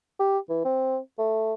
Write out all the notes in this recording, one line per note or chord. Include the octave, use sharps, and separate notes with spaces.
G4
E3
C4
A3